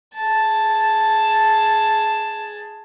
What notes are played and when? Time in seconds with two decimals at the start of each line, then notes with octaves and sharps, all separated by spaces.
0.17 G#4 A5